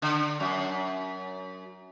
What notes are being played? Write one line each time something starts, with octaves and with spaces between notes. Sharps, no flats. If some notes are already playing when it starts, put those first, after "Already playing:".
D3
F#2